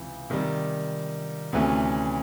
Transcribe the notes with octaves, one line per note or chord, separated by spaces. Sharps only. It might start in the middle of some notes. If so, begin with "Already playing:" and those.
Already playing: C#2 C3 E3
C3 D#3 G3
D2 C3 E3 A3 C#4